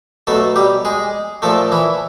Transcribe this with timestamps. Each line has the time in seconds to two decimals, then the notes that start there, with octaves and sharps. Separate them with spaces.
0.27 B2 F#3 A3 A4
0.56 G3 G4
0.85 G#3 G#4
1.42 A#2 F3 A3 A4
1.72 E3 E4